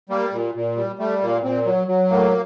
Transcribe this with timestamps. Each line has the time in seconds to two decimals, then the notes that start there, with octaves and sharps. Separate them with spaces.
0.09 G3 A#3
0.32 A#2
0.55 A#2
0.76 G3
0.99 G3 A3
1.22 A#2 A#3
1.43 A#2 C4
1.65 F#3
1.88 F#3
2.10 A2 A#3